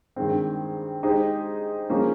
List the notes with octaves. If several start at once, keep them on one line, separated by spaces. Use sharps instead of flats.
G2 D#3 G#3 C4
G#3 D#4 G4 C5
F3 A#3 C#4 G#4 C5